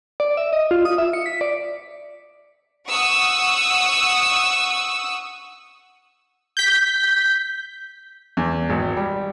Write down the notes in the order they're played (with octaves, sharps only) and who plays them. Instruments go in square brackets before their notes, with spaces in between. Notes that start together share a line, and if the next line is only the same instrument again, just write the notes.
[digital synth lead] D5
E5
D#5
F4
D#6
E5
C#7
B6
D5
[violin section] F#5 C#6 D#6 E6
[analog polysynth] G6 B6
[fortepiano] E2
G#1
G3